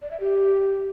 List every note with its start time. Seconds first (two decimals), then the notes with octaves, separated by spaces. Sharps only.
0.02 D5
0.11 E5
0.20 G4